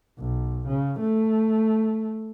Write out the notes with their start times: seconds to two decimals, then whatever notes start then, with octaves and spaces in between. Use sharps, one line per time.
0.19 B1
0.67 C#3
0.99 A3